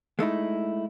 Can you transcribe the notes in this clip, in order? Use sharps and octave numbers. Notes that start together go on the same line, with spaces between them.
G#3 A3 D#4 E4